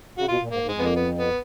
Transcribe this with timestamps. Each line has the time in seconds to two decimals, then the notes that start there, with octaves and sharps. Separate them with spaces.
0.17 C#3 F#4
0.28 B2 F4
0.41 A#2
0.51 G#2 A#3
0.63 G#2
0.69 G#3
0.74 F2 B3
0.86 A#3
0.96 B3
1.19 B3